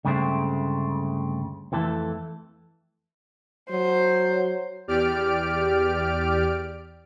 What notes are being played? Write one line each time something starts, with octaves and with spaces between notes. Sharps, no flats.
D2 G2 C#3 G#3 A3 C4
F2 E3 A3 A4
F#3 C5
E2 G4 D5 F6 D7